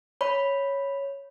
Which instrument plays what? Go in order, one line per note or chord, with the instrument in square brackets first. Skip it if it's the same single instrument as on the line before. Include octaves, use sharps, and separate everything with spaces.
[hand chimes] C#5 B5